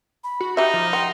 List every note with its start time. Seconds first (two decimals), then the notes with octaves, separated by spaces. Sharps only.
0.24 B5
0.41 F#4
0.57 D#4 G4 E5 A#5
0.74 F3
0.93 F#5 G5 C6